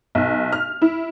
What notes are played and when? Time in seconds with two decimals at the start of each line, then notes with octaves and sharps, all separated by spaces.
0.15 B1
0.52 F6
0.82 E4